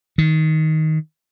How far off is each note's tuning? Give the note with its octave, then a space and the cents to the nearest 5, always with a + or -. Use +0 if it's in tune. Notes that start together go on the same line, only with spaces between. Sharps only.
D#3 +15